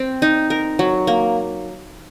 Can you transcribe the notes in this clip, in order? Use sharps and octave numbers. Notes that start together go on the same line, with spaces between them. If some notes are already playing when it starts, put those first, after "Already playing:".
Already playing: C4
D#4
A#4
F#3
A#3